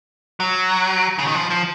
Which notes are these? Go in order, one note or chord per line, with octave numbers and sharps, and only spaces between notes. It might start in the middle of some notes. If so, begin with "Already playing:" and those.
F#3
C#3
D#3
F3
F3